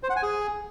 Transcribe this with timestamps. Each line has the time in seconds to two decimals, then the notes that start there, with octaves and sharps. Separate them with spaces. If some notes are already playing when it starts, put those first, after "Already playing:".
0.03 C5
0.10 F#5
0.16 G#5
0.23 G#4